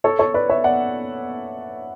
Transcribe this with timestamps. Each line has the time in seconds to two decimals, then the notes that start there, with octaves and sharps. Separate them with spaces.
0.04 A4 C#5
0.19 A4 C#5
0.34 B4 D5
0.50 C#5 E5
0.64 D5 F#5